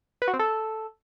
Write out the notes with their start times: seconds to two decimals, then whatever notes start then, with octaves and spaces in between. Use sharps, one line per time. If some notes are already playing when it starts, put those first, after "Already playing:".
0.22 B4
0.28 F#4
0.33 C4
0.39 A4